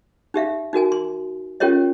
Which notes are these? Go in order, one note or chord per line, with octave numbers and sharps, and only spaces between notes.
D#4 G4 E5 F5
D#4 F#4 A#4 G#5
C6
C#4 F4 G4 A#4 C#5 D#5